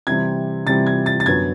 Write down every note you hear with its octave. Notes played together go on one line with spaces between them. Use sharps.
C3 E3 G3 C4 G#6
C3 E3 G3 C4 A6
G#6
A6
A6
F#2 D3 F#3 B3 G#6